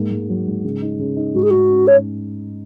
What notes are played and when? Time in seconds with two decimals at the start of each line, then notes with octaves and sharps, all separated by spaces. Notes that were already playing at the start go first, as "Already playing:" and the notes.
Already playing: G#2 A#3
0.11 G#2
0.29 F#3
0.47 G#2
0.64 C#3
0.82 D#4
0.99 C#3
1.17 D#4
1.34 G#2 F#4
1.43 G#4
1.50 G#2 F#4
1.69 C#4
1.87 C#5